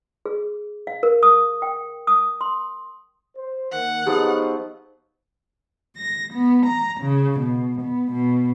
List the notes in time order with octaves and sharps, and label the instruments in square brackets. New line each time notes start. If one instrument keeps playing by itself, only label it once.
[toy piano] G#4
F5
A#4
D#6
G5
D#6
C6
[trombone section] C5
[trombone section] D#3 A#3 [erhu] F#5
[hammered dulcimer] F3 F#3 B3 [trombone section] D#4 [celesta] G4 G#4 B4
[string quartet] A#6
B3
A#5
C#3
B2
B3
B2